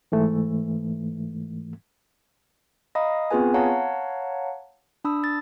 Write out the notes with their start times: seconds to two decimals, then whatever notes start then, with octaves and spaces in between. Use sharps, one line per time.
0.12 G#2 E3 A3
2.95 D#5 F5 A#5 B5 D#6
3.31 B3 C4 F4 G#4 B4 G#5
3.54 C#5 F5 F#5 A5 A#5
5.04 D4 B5 D#6 E6
5.24 A6